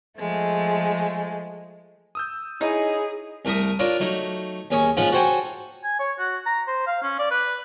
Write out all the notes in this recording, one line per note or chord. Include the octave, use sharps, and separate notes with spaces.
F3 G#3 A3
D#6 E6 G6
D#4 E4 G#4 C#5
C2 A3 A#4 E5 D#6
D4 F4 A#4 C#5
F#3 A3 D#4
D#2 C#4 G#4 C#6
G#2 F3 C#4 F4 F#5
F#4 A4 C5 C#5 G5 G#5
G#5
C#5
F#4
A#5
C5
F5
C#4
D5
B4